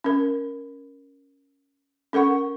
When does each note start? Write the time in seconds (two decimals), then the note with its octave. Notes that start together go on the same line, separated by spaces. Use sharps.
0.04 C#4 A#4
2.13 C#4 A4 A#4 F#5 C#6